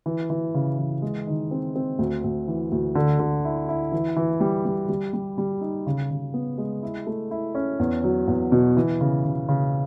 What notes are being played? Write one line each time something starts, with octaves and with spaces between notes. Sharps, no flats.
E3
E3
C#3
E3
G#3
D#3
C4
C4
D2
D2
E3
D2
D3
D3
E4
E4
E3
E3
G3
G3
G3
G3
G3
D#4
C#3
C#3
B3
G#3
E4
A3
E4
C#4
E2
F#3
E2
B2
E3
C#3
C#3
C#3